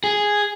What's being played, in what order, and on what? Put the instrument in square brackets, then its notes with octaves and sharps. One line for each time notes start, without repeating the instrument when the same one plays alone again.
[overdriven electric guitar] G#4